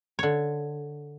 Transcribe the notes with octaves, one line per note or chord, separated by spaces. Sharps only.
D3 C#5